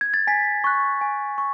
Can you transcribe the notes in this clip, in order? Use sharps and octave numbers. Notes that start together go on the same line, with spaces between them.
G#6
A6
G#5 B6
C#6 F#6
G#5
C#6